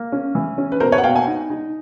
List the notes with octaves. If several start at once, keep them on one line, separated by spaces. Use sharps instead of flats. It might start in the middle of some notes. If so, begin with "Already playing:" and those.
Already playing: A#3
C#4
E3
C#4
B4
B2 A#4 C5
B4 C#5
F#5
B2 F5 G5
F#5 G#5
D#4
D#4